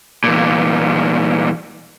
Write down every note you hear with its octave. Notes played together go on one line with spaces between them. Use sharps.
E2 A#2